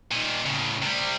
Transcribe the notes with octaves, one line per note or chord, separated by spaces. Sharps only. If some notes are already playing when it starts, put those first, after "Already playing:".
A#2 D#3
A2 C#3
C3 G3